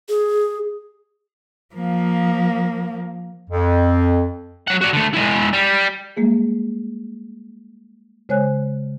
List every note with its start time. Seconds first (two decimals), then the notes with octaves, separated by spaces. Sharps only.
0.09 G#4
1.75 F3 A#3
3.50 F2
4.68 F#3 F#5
4.81 F#4 D5
4.93 D3 A3
5.14 G#3 E4
5.53 G3
6.17 G3 G#3 A#3 G#4
8.29 C#3 G#3 C5 C#5 G#5 F#6